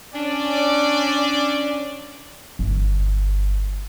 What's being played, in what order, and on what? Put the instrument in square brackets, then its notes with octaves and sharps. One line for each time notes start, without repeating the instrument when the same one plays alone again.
[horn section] C#4 D4 D5
[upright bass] G1